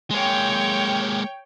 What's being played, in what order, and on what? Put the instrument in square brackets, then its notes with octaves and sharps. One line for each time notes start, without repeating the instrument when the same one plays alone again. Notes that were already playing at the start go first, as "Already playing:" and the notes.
[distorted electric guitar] G#3 A#3 [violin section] C#5 G5